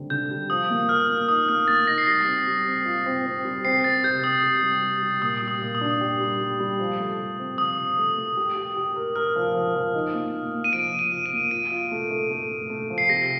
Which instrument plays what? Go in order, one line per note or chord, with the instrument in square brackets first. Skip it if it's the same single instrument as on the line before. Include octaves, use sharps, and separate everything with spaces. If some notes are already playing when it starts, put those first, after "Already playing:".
Already playing: [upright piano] D3 G3 C4
[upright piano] D3 [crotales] G6
[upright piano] G3
[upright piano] F3 [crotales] D#6
[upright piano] A#3
[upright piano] A#4 [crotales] F6
[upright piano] A#3
[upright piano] D#4 [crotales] D#6
[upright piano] A#3 [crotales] F6
[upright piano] A#3 [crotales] A6
[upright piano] D#4 [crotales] A#6
[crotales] C7
[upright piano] G3 [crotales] A#6
[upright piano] C4
G3
C4
F4
C4
C4
G3
[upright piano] C4 [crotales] C7
[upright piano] C4 [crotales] A6
[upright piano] C3 [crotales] G6
[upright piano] C4 [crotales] D#6
[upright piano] C3
G3
G3
G3
[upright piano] A#2 [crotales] D#6
[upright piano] G3
[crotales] D#6
[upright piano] A#2
[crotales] D#6
[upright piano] D4
G4
G3
G3
G3
F3
A3
A3
C4
[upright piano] F3 [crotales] D#6
[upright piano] F3
A3
A3
G4
G4
G4
A#4
[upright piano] A#4 [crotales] F6
[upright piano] F3
F3
F3
D#4
A#3
A#3
A#3
[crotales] D#7
[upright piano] F3 [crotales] D7
[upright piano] F3
[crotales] D#7
[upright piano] F3
[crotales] D#7
[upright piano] A#3
[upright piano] F4 [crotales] D7
[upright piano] F4
A3
A3
A3
A3
A3
F3
[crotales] C7
[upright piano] C3 [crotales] A#6